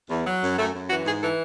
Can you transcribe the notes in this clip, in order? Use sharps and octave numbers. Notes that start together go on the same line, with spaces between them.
E2
F#3
F#2
F#2 A3
F#2
E3 F#4
G#2 G#4
E3 A4